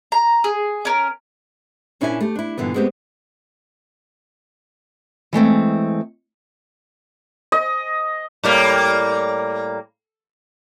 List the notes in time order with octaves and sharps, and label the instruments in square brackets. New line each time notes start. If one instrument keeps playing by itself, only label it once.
[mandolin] A#5
G#4
C#4 A#4
[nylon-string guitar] A#2 C#4 D4 E4 D5 G#5
A3 G4
D4 E4
G2 A#2 D3 E3 B3
G#3 A3 B3 C4 G4
[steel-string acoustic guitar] E3 G#3 A3 C4
[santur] D#5
[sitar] A2 G3 A#3